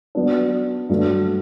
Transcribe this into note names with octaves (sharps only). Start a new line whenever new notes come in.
F#3 B3 D4
G2 F#3 A3